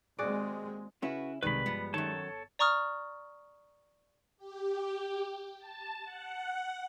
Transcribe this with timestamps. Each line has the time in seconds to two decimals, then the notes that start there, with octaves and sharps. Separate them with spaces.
0.19 D#2 G#3 C4 F#4 G#4 D5
1.02 C#3 C#4 E4 F#4 B4
1.43 B1 C3 D#3 G3 G#3 B4 B5
1.66 G1 F3 B3
1.94 F#2 D#3 A4 C#5 A5
2.59 D5 A#5 C#6 D#6 F6
4.37 G4
5.59 A5
6.04 F#5